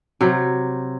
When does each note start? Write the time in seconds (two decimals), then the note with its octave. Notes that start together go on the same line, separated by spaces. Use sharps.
0.21 C3 F#3